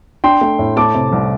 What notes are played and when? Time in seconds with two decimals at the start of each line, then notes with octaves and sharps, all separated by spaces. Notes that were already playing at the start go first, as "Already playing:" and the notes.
0.24 D4 G5 C6
0.41 A3
0.59 A2
0.77 A3 A5 D6
0.94 C3
1.12 C2